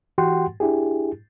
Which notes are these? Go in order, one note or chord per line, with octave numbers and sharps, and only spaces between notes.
E3 F#4 G4 F#5 G5 C6
D4 E4 G4 G#4